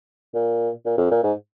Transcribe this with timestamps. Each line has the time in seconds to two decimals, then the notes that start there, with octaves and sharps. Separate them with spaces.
0.34 A#2
0.86 A#2
0.98 F2
1.11 A#2
1.24 G#2